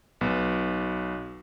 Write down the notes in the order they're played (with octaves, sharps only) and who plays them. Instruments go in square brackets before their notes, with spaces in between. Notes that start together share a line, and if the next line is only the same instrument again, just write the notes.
[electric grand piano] B1 B3